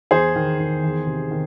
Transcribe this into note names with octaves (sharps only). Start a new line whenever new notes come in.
E2 G#4 C5
D#3
D#3
E2
C3
D#3